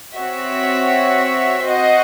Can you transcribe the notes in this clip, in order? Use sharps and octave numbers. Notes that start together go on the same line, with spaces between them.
C4 F#4 C#5 E5
F#4 C5 D#5